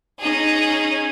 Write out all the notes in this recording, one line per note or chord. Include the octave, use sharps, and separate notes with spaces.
C#4 D#4 G#4